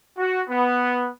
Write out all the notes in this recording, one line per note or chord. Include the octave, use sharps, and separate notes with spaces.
F#4
B3